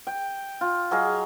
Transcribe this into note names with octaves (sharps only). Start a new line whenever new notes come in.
G5
F4
F#3 G#4 D#5 F5